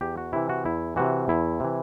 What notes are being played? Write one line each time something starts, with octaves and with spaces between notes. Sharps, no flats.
E2 G4
F#4
C3 E3 E4
F#4
E2 E4
C3 E3 F#4
E2 E4
C3 E3